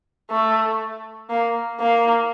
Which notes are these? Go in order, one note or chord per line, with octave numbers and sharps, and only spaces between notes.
A3
A#3
A#3